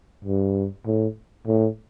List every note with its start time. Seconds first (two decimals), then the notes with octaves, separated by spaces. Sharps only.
0.25 G2
0.86 A2
1.46 A2